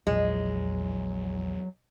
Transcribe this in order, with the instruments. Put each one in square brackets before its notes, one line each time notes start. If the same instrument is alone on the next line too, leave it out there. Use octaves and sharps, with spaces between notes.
[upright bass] A#1 [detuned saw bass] E2 [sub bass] F#3 [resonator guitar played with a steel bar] G#3